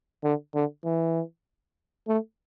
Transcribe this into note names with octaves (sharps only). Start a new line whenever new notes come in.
D3
D3
E3
A3